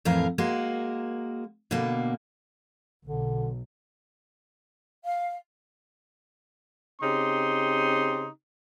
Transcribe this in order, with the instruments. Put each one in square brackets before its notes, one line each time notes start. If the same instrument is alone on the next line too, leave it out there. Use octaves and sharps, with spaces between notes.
[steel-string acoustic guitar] F2 A2 E3 A#4 F5
G#3 A#3 F#4 A#4
B2 D3 A#3
[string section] B1 [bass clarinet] D3
[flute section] F5
[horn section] C#3 C4 D#4 G4 C6